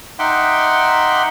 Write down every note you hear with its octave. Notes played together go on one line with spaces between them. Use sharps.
D#4 E5 F#5 G5 C6 D6